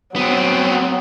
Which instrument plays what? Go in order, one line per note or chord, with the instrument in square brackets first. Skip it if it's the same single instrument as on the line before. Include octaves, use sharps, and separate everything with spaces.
[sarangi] F#3 [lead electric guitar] B3 C4